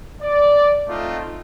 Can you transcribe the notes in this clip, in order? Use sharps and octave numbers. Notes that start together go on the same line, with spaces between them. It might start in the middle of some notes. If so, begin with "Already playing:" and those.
D5
A3 C4 D#4 F4 D#5